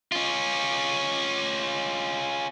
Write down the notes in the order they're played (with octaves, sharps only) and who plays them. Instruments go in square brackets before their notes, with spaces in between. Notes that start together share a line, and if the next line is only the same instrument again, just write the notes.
[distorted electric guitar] C#4 F4